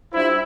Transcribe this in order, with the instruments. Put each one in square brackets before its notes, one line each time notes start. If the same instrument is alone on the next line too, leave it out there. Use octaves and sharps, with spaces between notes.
[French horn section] G3 D4 F4 C5 [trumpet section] E4